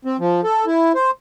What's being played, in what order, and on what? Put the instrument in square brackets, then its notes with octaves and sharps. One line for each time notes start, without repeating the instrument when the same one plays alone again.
[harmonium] C4
F3
A4
E4
C5